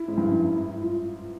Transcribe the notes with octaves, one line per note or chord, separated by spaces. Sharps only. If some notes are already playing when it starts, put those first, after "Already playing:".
Already playing: E4
G#2
G2
F#2
F4